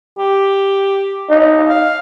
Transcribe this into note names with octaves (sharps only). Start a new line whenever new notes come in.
G4
D#4
F5